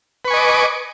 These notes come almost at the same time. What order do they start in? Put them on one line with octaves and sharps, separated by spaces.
B4 C#6 G#5 D#5 D6